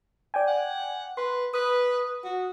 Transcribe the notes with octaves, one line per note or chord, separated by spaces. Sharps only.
D5 G5 G#5
F#5
B4 C6
B4 D#6
F#4